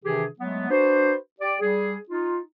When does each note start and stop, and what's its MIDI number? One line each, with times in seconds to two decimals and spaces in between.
0.04 0.26 48
0.04 0.26 51
0.04 0.26 52
0.04 0.26 62
0.04 0.26 67
0.04 0.26 68
0.40 0.67 54
0.40 0.67 56
0.40 0.67 57
0.40 0.67 59
0.70 1.14 62
0.70 1.14 66
0.70 1.14 71
0.70 1.14 72
1.41 1.56 67
1.41 1.56 74
1.60 1.97 55
1.60 1.97 68
2.09 2.39 63
2.09 2.39 65